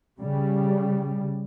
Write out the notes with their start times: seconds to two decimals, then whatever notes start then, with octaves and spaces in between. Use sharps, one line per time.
0.20 C#3 G3